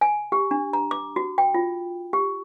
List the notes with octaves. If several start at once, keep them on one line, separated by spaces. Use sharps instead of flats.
G#5
G4
D4
A#5
D6
F#4
G5
F4
G4